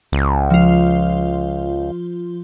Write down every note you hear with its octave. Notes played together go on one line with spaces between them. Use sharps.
C#2
F3 F4